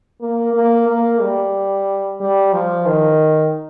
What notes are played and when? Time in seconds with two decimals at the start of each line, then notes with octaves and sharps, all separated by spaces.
0.21 A#3
0.54 A#3
0.88 A#3
1.21 G3
2.20 G3
2.53 F3
2.86 D#3